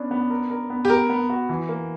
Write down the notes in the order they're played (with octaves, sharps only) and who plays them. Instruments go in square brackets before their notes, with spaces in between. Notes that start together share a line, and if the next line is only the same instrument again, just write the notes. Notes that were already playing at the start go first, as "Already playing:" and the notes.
Already playing: [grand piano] B3 C#4 D4
B3
A#4
A#4
B3
[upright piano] G4
[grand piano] B3 [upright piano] A#4
[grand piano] B3
F#4
E3
A#3